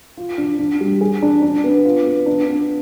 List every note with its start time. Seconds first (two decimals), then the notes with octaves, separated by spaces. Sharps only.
0.17 F4
0.38 D4
0.59 D4
0.81 G3
1.01 G#4
1.22 D4
1.42 D4
1.64 B3
1.85 F4
2.06 B3
2.26 D4
2.48 B3